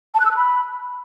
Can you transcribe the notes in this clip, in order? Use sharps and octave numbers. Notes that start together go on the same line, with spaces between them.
A5
F#6
E6
F#6
B5